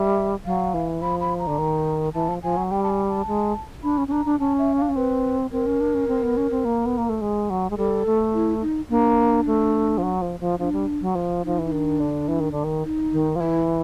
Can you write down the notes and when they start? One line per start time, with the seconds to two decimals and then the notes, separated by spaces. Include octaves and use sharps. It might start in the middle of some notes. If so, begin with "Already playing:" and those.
Already playing: G3 E5
0.46 F#3 F5
0.74 E3
1.02 F3 B5
1.21 B5
1.39 A#5
1.47 D3
1.58 D#3
2.14 E3 A5
2.29 F3
2.43 F3 G#5
2.57 F#3
2.71 G3 G5
2.83 A5
2.90 G#5
3.08 A5
3.27 G#3
3.83 D4 B5
3.98 C#4
4.08 C#4
4.11 D4 A#5
4.26 D4
4.40 C#4 A5
4.59 E5
4.78 D4 F5
4.89 C#4
4.96 C4 B4
5.52 C4 A#4
5.66 C#4
5.81 D4
5.94 C#4
6.08 C4
6.23 B3
6.37 C#4
6.51 C4
6.65 A#3
6.86 B3
6.98 A#3
7.09 A3
7.21 G#3
7.50 F#3
7.70 G#3
7.77 G3 A4
8.06 A3
8.34 E4
8.62 D#4
8.90 A#3 D4
9.47 A3
9.98 F3
10.03 F#3
10.22 F3
10.40 F3
10.59 F3 D4
10.73 G3
11.01 F#3
11.15 F3
11.44 F3 D#4
11.59 E3
11.65 D#4
11.72 D#3 D4
12.00 D3
12.28 E3
12.40 D#3
12.52 D3
12.64 D#3
12.84 D#4
13.13 D#3
13.36 F3
13.40 E3 E4